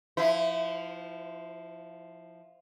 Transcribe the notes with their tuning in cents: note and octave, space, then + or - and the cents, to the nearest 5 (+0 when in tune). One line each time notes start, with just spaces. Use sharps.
F3 +0 E4 -15 C5 -45